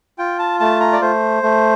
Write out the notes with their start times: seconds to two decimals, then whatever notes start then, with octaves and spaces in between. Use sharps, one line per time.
0.19 F4 G5
0.39 A5
0.60 A3 A5
0.80 A#5
0.93 D5
1.02 A3 C5
1.43 A3